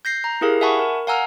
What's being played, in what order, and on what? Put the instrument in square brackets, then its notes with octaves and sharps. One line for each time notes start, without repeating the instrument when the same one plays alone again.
[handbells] G6 A#6 C7
A#5
E4 G4 G#4 A#4 F5
E5 F#5 G#5 A5 B5 C#6
A#4
F5 F#5 G#5 A#5 E6 F6